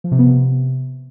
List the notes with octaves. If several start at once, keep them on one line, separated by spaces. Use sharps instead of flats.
F3
C3
B3
C3